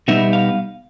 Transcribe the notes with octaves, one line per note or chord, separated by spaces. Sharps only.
B2 G3 B3 D#4 E5
F5